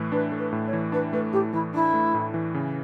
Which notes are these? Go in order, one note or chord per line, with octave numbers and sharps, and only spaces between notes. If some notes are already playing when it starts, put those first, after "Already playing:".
Already playing: A2 E3 A3
D4 B4
A3
B4
A2
C#5
E3
D4 B4
A3 B4
A2 G4
E3 E4
D4 E4
A3
A2
E3
C#3